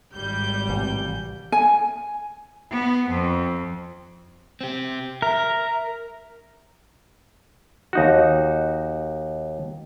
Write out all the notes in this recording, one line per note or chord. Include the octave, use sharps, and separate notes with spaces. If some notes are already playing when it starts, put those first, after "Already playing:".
G#1 G3 G6
A1 C3
G#5
B3
F2
C4 G4
A#4 E5
D#2 D#4 F#4